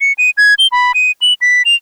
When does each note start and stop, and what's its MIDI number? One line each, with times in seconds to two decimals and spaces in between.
0.01 0.13 97
0.18 0.30 99
0.38 0.54 92
0.59 0.67 103
0.72 0.92 83
0.95 1.12 99
1.22 1.34 102
1.41 1.62 95
1.65 1.75 101